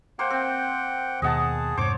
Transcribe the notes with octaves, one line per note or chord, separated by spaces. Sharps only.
A#3 C5 F#5 G5
C4
D#2 B2 G#4 D#5 F#5 A5
F2 G#2 C3 C5 C#5 D6